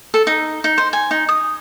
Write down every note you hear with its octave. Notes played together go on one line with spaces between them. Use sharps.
A4
D#4
D#4
C5
G#5
D#4
D#6